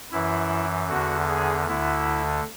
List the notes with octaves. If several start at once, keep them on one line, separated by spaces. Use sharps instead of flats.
F#2 E3 E4
E2 D3 F#4
G#4
D2 D3 E4